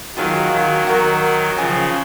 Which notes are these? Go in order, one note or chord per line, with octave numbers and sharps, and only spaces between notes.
D#3 F#3 F4 G#4 C#5 F5
D#3 F#3
D#3 F#3 F#4 A#4 D#5
C#3 F3 C#5 G#5 D#6